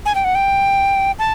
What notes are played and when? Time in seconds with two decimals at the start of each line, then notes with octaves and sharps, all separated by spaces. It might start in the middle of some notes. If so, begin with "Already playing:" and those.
0.06 G#5
0.15 G5
0.24 F#5
0.35 G5
1.19 A5